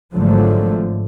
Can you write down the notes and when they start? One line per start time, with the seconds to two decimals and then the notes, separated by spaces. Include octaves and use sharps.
0.14 G#1 G#2 D3 F3 F#3 A3